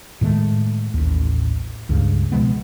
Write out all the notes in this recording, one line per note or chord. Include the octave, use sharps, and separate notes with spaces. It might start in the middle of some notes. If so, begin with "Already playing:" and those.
A2 D#3 G#3 A3
A1 D#2
C#2 G2 C#3
B2 F3 G#3 B3